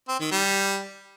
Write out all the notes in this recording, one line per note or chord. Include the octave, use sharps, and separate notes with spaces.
C4
D#3
G3